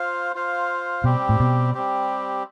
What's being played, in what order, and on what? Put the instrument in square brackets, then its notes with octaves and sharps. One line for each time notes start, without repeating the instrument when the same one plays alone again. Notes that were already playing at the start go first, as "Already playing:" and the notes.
Already playing: [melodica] F4 C5 F5
F4 C5 F5
[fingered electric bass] B2 [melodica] G3 C4 G4
[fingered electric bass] A2
B2
[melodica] G3 C4 G4